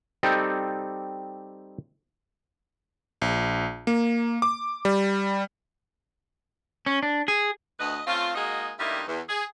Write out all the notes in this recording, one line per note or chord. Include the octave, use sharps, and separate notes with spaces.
G3 C4 D#4 G4 A4
A#1
A#3
D6
G3
C#4
D4
G#4
D2 B4 D#5
A3 C4 C#4 F4
G#3 A#3 D#4 F#4 G#4 D#5
G2 G3 A3 A#3 D#4 E4
E2
G#4